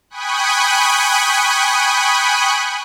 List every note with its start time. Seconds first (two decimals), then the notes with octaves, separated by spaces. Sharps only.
0.10 G5 G#5 B5 C#6 D#6 F#6